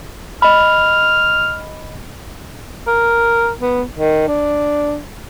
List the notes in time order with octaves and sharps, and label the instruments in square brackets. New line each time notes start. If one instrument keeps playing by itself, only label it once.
[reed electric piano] D#5 B5 [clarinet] F6
[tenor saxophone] A#4
B3
D#3
D4